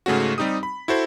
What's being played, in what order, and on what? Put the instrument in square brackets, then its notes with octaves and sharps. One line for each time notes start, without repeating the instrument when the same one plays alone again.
[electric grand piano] G#2 C#3 A3 C#4 F#4
G3 C4 D#4 G4 D#6
B5
E4 F#4 A4 C5